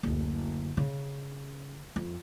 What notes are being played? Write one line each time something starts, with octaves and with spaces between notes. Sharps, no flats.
F#1 D2
C#3
F2